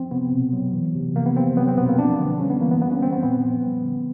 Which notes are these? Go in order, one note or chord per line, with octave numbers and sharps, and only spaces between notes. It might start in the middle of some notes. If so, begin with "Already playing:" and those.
Already playing: F3 C4
C3 B3
B2
F#3
E3
C3
F3 A#3
B3
C3 C4
F#3 B3
C4
B2 B3
A#3
F3 D4
D3
G3 C#4
B3
E3 A#3
B3
G3 B3
C#4
D#3 C4
B3
A#2 B3
F3
G3
D3